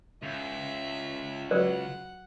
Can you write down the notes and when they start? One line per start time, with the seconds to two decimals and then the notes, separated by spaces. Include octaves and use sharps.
0.23 C#2 E5
1.51 F#3 F#4 B4 C#5 D5 F#5